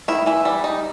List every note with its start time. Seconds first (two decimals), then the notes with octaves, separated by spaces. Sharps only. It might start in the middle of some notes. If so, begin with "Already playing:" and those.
0.08 D#3 E4
0.26 E3 E4
0.45 G3
0.64 D#4